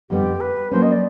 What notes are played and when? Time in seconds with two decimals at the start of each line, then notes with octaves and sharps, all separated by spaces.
0.10 F2 D3 G3 B3 G4
0.40 B4
0.71 F#3 A#3 C#4 C5
0.82 D#5
0.92 D5